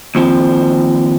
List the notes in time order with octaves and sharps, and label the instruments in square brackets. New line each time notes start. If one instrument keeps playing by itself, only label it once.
[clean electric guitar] D#2 F3 C4